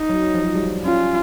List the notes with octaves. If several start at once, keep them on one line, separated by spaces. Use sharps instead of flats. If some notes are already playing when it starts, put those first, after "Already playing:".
Already playing: D#4
F#3
F3
F#3
G3
C#4 F4